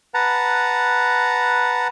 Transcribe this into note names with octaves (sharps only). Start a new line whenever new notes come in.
B4 F#5 A5 A#5